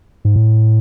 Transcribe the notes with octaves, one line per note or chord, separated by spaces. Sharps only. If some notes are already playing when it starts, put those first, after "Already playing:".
G#2
A2